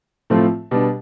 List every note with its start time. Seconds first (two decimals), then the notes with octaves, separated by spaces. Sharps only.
0.30 A2 F3 A3 C4 F4
0.71 B2 G3 D4